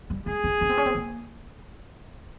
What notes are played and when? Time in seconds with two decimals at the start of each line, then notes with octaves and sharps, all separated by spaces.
0.10 G3
0.26 G#3 G#4
0.44 C4
0.61 C#4
0.69 C4
0.78 C#4
0.86 C4
0.95 A#3